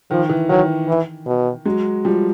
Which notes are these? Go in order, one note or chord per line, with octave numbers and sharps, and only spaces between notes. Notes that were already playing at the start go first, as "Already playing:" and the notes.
D#3 F3
E3
D#3 F#3
E3
B2
F#3 G#3
F3 G3